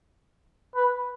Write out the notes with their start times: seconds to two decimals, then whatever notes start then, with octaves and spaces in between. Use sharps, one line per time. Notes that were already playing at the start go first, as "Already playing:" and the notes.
0.75 B4